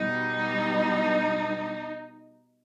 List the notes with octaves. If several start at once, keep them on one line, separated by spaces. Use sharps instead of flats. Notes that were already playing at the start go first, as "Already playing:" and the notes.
Already playing: B2 G3 D#4